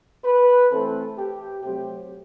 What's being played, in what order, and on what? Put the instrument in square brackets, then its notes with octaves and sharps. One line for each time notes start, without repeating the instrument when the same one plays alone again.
[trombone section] B4
E3 A3 C4 A4
G4
C3 F#3 A3 C4 G4